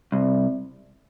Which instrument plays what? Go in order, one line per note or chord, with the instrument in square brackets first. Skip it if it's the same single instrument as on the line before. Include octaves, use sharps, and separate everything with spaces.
[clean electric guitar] C2